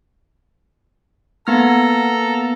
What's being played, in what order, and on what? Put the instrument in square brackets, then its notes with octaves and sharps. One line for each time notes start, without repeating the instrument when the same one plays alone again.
[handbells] A#3 B3 F6 [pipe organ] A4 A#5